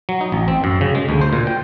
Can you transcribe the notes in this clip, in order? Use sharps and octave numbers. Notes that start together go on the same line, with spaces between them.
F#3
D#4
A1
C4
F#2
C#3
G#3
D2
C5
A#2
G5